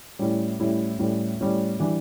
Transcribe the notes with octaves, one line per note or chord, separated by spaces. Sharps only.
A2 G3 C#4 E4
A2 G3 C#4 E4
A2 G3 C#4 E4
A2 G3 C#4 E4
E3 G3 D4